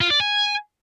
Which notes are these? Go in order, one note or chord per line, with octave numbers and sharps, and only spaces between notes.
F4
D5
G#5